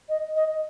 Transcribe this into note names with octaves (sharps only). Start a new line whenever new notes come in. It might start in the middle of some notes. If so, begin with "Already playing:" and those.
D#5
D#5